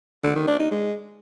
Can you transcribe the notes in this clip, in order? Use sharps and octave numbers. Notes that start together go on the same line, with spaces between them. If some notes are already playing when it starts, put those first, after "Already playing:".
D3
D#3
D4
D#4
G#3